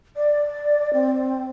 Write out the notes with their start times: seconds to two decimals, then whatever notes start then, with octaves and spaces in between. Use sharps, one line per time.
0.16 D5
0.93 C4